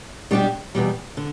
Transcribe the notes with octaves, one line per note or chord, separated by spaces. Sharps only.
B2 G3 D4 G4
E2 B2 G3
D3